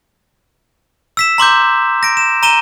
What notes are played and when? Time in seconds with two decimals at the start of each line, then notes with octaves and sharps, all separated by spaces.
1.17 E6 B6 E7
1.38 A#5 C6 D6 G6
2.03 A#6 D7
2.17 E7
2.43 A#5 D#7 E7 G7